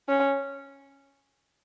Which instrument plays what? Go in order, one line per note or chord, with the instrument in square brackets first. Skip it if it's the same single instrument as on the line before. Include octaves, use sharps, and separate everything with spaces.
[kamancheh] C#4